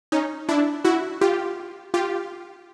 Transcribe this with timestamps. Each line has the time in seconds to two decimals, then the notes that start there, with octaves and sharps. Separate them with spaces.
0.12 C#4 D#4
0.49 D4 E4
0.85 E4 F#4
1.21 F4 G4
1.94 F4 G4